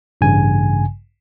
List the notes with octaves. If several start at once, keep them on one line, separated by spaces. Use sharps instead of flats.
A1 G2 C#3 G#5